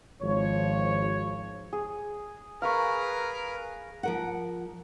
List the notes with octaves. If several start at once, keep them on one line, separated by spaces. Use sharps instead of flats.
G#1 F3 C#5
G#4
G#4 A#4 B4 F5 B5 C#6
F3 A#4 F#5